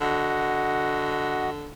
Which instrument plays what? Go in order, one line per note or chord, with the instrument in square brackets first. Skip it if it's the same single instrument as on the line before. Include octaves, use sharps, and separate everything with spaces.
[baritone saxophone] D3 [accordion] F#4 D#5 F#5